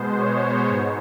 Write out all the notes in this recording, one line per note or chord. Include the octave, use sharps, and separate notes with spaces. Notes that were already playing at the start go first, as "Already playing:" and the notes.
Already playing: B2 G#3 B3 C5
C#5
G#2